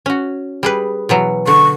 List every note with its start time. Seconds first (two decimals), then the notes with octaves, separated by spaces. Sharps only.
0.06 C#4 F#4
0.63 G3 G#4 B4
1.09 B2 E3 F#3
1.47 D3 C#6